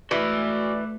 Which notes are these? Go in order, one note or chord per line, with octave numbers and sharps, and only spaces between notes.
E3 A3 F#4 D5 E5